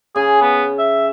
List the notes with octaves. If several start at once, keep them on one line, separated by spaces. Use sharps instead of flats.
C#3 G#4
B3
E5